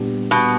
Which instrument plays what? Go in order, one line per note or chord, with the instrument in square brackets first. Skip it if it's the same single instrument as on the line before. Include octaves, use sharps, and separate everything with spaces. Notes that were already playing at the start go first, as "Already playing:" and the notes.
Already playing: [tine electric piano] A#2 G3 B3 D4 G4
[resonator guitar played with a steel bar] B2